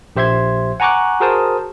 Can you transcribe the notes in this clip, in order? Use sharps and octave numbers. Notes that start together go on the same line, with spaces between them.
A#1 G4 C5 E5 C6 G#6
F#5 G#5 A#5 C#6 D6 F#6
F#4 G#4 A#4 C5 A5 D#6